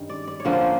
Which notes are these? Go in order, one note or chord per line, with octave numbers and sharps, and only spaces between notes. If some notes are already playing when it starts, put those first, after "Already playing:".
Already playing: G2 D#3 C#4
D5
D5
C#5
D3 F3 A#3 C#4
C5